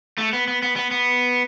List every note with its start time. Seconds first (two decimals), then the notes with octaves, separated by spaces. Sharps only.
0.18 A3
0.33 B3
0.48 B3
0.63 B3
0.76 B3
0.91 B3